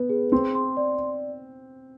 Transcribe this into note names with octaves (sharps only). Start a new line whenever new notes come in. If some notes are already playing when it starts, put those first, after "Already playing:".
Already playing: B3 B4
G#4
C4 C6
C6
D5